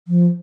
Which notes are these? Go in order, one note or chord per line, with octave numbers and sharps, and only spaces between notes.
F3